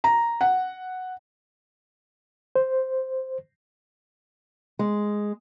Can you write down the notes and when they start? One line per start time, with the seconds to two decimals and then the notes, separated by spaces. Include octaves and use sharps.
0.04 A#5
0.41 F#5
2.56 C5
4.79 G#3